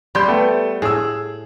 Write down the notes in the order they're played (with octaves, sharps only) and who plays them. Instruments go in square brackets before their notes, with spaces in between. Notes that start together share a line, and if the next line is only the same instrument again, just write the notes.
[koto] G3 [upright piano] B5 C6 G6
[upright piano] A3 B3 G5
[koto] A2 [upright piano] G#4 E6